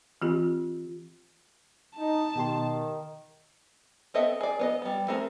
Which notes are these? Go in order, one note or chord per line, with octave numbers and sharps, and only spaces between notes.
E3 C4 F4 G4
D#4 A5
B2 D#3 G4 C6
B3 C4 A4 D#5 E5
G#4 D5
B3 C#5 D#5
G3 B3
A3 C4 G#4 A#4